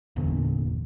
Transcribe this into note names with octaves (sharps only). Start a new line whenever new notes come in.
G1 E2 A#2 D3